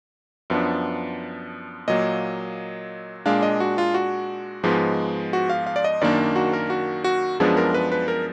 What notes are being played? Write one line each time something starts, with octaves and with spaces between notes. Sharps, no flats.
F#2 F3 B3 D4
A#2 F#3 A#3 D#5
A#2 G#3 D4 F5
D#5
F#4
F4
F#4
G#2 F3 G#3 B3
F#4
F5
F5
D5
D#5
F#2 D#3 A#3 D4 D5
F#4
A#4
F#4
F#4
F#2 F3 G#3 B3 D4 G#4
A#4
B4
B4
A#4